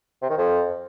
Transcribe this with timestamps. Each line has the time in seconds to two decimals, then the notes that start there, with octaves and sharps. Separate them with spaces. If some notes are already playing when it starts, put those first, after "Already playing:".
0.22 C3
0.30 D#3
0.37 F2